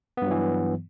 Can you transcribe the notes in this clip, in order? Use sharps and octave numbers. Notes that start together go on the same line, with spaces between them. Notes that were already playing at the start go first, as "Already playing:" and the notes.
G2 E3 F#3 B3